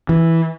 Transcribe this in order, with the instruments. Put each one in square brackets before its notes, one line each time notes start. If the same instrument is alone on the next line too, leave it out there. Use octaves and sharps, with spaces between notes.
[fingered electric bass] E3